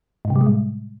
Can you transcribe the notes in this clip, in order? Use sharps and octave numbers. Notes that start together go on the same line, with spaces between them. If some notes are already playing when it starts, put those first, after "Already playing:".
G#2
C3
G3
G#3
A2